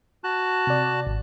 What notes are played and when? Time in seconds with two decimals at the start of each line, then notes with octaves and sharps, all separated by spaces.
0.24 F#4 A5 F#6
0.67 C3 D5
1.07 G#1